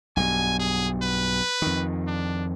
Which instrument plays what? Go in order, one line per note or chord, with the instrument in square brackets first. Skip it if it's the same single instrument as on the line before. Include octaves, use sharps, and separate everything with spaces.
[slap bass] B1 G2 [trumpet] G#5
[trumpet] G#4
B4
[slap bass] F2 D#3
[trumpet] D4